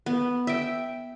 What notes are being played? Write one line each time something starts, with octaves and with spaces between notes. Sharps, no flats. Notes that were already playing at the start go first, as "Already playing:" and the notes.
B3
E5 G5